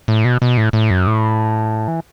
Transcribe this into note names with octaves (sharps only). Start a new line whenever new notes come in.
A2
B2
B2
A2
A2
F#2
A2
E3